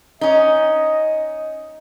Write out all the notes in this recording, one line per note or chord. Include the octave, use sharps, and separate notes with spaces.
C#4 D#4 D#5